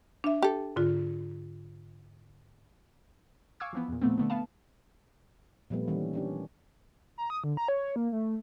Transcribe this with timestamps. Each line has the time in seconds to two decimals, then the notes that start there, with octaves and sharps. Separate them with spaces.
0.24 D4 E5
0.42 G4 A4
0.76 G#2 D3 F4
3.60 F5 G#5 C#6 D6 E6 G#6
3.73 E3 F3 B3
3.89 E2 A#2
4.02 A#2 F3 A3 B3 C4
4.18 D3 A3 B3
4.30 B3 F5 A5
5.70 A#2 F3 G3 A3 B3
5.88 D#3 E3 G3 C#4
6.13 C#4 D4 G4
7.18 A#5
7.30 D#6
7.44 D3
7.57 A#5
7.68 C#5
7.96 A#3
8.12 A3